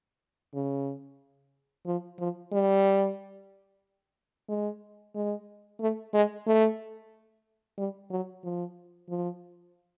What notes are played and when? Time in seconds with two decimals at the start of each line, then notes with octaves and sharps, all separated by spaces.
0.55 C#3
1.86 F3
2.19 F3
2.52 G3
4.49 G#3
5.15 G#3
5.80 A3
6.13 G#3
6.47 A3
7.78 G3
8.11 F#3
8.44 F3
9.09 F3